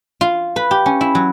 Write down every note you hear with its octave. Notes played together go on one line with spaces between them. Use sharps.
F4
B4
G4
C#4
E4
F#3